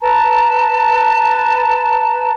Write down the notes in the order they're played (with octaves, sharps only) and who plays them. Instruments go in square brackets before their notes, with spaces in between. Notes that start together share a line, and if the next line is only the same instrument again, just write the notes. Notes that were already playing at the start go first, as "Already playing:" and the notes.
[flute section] B4 A5 A#5